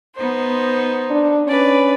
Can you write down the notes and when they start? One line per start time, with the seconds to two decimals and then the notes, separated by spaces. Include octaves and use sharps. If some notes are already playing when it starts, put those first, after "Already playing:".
0.16 B3 D#4 C5
1.11 D4
1.48 C#4 B4 D5